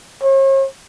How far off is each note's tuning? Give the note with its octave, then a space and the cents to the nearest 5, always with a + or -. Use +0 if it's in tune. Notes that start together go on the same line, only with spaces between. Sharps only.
C#5 -45